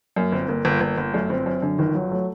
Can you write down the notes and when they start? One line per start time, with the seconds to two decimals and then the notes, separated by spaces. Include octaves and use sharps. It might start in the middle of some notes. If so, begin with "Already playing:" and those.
0.16 F#2 A#3
0.32 G1 C4
0.48 G1 A#3
0.65 G1
0.81 G1
0.98 G1
1.14 F#2 A3
1.30 G1 C4
1.46 F#2 C4
1.62 F#2 D3
1.78 G1 D#3
1.95 G1 F#3
2.11 F#3 A3